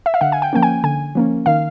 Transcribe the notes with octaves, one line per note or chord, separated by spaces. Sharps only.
E5
F5
D3 F#5
G#5
G5
F3 A#3 C#4 G5
G#5
D3 G#5
F3 A#3 C#4
D#3 F5